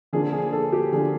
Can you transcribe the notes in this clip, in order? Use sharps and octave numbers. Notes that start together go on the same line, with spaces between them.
D3 F3 A#3 D4 G#4
G#4
A4
G4
D3 F3 A#3 D4 G#4